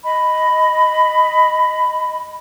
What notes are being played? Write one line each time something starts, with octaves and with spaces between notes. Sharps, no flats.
D#5 B5